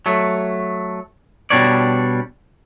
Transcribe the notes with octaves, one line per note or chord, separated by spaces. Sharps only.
F#3 A3
B2 G3 D4 C#5 D5